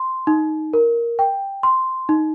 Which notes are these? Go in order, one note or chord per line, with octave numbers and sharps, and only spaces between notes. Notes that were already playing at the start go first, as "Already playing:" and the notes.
Already playing: C6
D#4
A#4
G5
C6
D#4